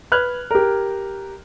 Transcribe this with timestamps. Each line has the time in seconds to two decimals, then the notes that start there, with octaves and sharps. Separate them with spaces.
0.12 B4 F6 F#6 G#6
0.51 G4 A#4